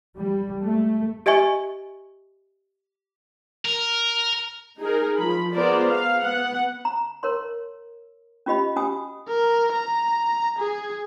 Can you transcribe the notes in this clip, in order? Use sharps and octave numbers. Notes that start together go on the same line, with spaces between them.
G3
A3
G4 D#5 E5 G#5 C#6
A#4
D#4 G#4 A#4
F3 B5
B3 F4 G#4 A#4 C5 D5
F5
B3 F#5
A#5
A#4 C#5 C6
C#4 F4 G4 D#5 B5
C#4 F#4 G4 G#5 D#6
A#4
A#5
G#4